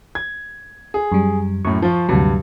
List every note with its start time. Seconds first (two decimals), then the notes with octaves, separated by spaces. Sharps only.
0.15 G#6
0.94 G#4
1.12 F#2 G3
1.65 F#2 A2 C#6
1.82 F3 F4
2.09 D2 G2 C3 F#3